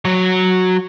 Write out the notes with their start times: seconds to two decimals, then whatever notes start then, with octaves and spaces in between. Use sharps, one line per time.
0.05 F#3 C#5